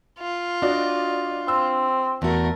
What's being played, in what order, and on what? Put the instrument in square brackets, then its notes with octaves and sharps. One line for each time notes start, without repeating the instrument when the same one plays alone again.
[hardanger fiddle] F4
[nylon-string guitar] D4 [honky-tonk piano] F#4 D5 D#5
[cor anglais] C4 [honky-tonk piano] E6
[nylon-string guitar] E2 F#4 [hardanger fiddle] A3 A#4